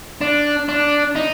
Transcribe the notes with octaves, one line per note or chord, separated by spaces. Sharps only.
D4
D4
D#4